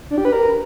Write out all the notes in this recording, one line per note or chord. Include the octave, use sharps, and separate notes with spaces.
D4
G4
B4
A#4